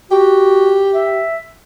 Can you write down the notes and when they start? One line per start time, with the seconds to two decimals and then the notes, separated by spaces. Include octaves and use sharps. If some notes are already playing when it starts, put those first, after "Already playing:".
0.11 F#4 G4
0.94 E5